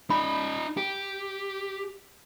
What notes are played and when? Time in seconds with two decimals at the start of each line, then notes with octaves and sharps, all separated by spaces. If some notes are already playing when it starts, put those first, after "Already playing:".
0.10 D#4 D5 B5
0.77 G4